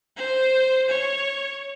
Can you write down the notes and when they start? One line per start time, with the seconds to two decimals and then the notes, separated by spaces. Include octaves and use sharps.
0.17 C5
0.89 C#5